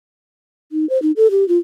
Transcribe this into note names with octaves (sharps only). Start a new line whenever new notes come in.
D#4
C5
D#4
A4
G4
F4